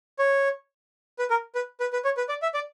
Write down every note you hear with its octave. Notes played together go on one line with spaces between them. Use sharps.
C#5
B4
A#4
B4
B4
B4
C#5
B4
D5
E5
D5